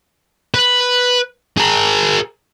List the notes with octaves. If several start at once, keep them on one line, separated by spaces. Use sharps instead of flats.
B4
G#4 A#4